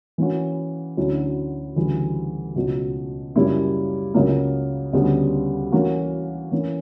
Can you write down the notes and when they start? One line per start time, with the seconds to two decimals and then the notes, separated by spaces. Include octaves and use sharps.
0.18 E3 A#3 C#4 F#4
0.97 D2 D3 F#3 C#4 E4
1.76 D2 C#3 E3 G3
2.56 C#2 B2 F#3
3.36 F#2 C#3 G3 A#3 E4
4.14 C#2 C#3 F#3 A#3
4.93 D2 C#3 G3 B3
5.72 E3 A#3 C#4 F#4
6.51 E3 A#3 C#4